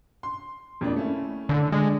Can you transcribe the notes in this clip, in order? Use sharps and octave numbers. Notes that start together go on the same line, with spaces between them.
C6
F2 A#3 D4
A3 C#4 E4
D3
G#3 D4